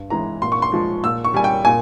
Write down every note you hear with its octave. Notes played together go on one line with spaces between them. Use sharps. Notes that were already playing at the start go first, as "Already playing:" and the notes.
Already playing: G2
E3 G#3 A#5
A#2 C6
C#6
C6
F3 G#3
A#2 E6
C#6
G3 G#5
G5
A#2 G#5